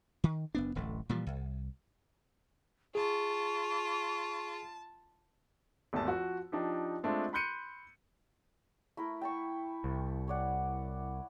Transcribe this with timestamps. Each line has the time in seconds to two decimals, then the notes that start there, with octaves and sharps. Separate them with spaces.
0.24 D#3
0.55 F#1 B3 D4
0.75 D1 A1 A3
1.09 A#2 E3 F3 G3
1.27 C2
2.95 F4 G#4 A5 C#6
5.93 G#1 E2 A3 G4 A5 E6
6.06 F3 F#4
6.52 F3 D4 D#4 G4
7.03 G#3 A3 C4 D4 F4
7.33 B5 C6 F#6 G6 C#7 D#7
8.97 A3 E4 A#4
9.21 G5 A5 C#6
9.84 C2
10.28 C#5 D5 F#5